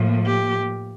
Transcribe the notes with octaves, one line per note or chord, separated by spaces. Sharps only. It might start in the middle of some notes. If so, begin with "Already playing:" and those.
Already playing: A2 F3 A#3
G4